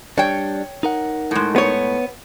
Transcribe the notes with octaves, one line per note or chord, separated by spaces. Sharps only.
G3 D4 C#5 G5
D#4 A#4 F#5
A2 G#3
B3 C#5